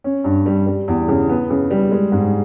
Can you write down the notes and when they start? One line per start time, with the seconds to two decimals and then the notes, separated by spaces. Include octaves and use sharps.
0.04 C#4
0.24 G2
0.46 G3
0.67 G3
0.88 E2
1.08 C#3
1.29 B3
1.50 C#3
1.71 G3
1.92 G#3
2.12 G#2